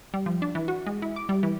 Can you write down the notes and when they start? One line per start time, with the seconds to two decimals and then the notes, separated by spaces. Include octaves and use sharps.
0.14 G3
0.26 F3
0.42 D4
0.55 E3
0.68 F#4
0.87 G#3
1.02 E4
1.16 D6
1.29 G3
1.43 E3